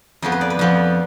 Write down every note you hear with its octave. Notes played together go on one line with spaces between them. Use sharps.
F2 F3 B3 G#4
B4
D5
B4
F2 F3 B3